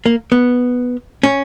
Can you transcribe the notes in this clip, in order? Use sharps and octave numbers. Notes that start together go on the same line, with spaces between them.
A#3
B3
C#4